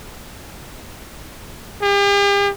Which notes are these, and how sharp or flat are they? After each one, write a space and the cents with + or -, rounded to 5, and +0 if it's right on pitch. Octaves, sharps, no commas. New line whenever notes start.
G4 +45